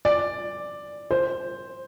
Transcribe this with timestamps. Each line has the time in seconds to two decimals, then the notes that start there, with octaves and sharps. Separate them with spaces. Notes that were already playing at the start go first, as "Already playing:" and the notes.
0.05 D5
1.11 C5